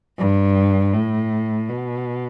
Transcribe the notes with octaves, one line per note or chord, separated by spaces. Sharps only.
G2
A2
B2